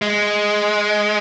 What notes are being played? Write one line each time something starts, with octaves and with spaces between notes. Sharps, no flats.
G#3